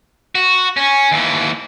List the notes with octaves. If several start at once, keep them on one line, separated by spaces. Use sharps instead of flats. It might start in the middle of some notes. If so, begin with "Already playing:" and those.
F#4
C#4
D#2 E3